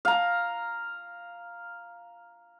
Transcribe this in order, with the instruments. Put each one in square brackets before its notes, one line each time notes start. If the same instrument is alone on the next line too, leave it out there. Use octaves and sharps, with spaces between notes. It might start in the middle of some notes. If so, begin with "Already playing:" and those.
[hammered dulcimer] F5 A#5